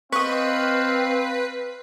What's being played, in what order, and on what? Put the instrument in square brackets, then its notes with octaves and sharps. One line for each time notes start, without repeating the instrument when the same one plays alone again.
[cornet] C4 [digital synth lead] B4 [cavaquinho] D#5 C#6 [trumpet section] F5